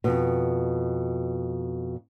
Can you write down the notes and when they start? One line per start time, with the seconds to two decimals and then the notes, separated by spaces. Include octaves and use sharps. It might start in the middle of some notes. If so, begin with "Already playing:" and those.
0.04 F2 B2